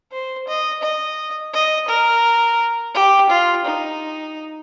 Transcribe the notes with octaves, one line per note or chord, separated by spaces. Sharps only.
C5
D#5
D#5
D#5
A#4
G4
F4
D#4